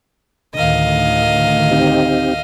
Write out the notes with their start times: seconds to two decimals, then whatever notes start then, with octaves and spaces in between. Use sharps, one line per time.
0.54 D2 A2 D#3 D#5 F5
1.71 C4 D#4 G4